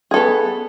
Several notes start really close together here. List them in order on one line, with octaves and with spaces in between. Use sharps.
G#4 A4 B3